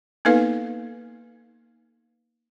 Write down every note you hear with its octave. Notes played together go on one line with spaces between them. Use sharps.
A#3 B3 D#4 A4 B4 F5